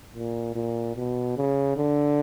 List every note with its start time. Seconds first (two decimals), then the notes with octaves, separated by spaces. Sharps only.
0.15 A#2
0.55 A#2
0.96 B2
1.37 C#3
1.76 D3